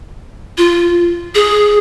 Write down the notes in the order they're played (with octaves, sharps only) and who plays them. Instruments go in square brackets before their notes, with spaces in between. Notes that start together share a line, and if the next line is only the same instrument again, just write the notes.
[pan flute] F4
G#4